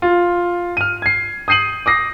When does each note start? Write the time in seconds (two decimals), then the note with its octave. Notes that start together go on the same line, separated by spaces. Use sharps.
0.02 F4
0.77 F6 D#7
1.02 G#6 C7
1.48 D#6 G6 C7 D#7 F#7
1.86 D6 D#6 A#6 C7